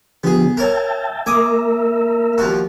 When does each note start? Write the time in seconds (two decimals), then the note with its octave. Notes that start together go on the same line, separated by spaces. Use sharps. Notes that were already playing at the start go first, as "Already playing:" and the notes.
0.24 D3 F3 B3 G4 G#4
0.57 A#4 C#5 E5 G5 A5
1.26 A#3 A#4 E5 G#5 D6 D#6
2.38 D#2 F3 F#4